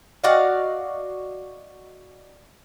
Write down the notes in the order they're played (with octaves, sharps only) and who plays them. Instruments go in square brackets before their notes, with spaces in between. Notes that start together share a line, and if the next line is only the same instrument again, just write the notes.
[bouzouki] F#4 D5 D#5 F5